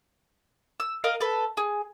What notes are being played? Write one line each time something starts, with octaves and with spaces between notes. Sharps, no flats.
E6
A#4 D#5 F5
A4 B4
G#4